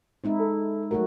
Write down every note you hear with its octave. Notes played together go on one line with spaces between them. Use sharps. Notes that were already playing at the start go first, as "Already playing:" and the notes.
G#3 C4 D#4 E4
A4
F#3 A3 F#4 A#4